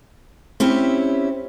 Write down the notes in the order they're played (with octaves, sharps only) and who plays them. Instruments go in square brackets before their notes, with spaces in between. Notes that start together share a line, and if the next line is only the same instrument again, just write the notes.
[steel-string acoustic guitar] C4 C#4 E4 G4